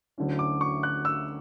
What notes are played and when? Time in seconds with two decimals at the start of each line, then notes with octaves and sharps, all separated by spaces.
0.18 D2 D3 F#3 C#4 E4
0.39 D6
0.61 C#6
0.83 F#6
1.05 E6